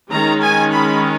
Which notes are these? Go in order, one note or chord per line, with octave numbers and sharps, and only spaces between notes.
D#3 G#3 C#4 A#5
G#5
B5